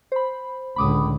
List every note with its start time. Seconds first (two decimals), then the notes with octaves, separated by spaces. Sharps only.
0.12 C5 B5
0.76 C#2 A2 D3 B5 D6 D#6